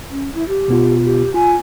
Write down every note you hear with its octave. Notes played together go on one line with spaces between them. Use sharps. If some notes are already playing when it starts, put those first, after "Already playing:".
C#4
E4
G4
B2 B3 F4
G4
F4 G#5